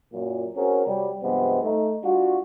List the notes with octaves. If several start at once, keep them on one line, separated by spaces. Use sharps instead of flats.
F#2 A#2
C4 C#4 F#4 G#4 A#4
C3 F#3 G3
G2 C3 F3 G#3 B3
A3 D#4
G3 D4 F4 F#4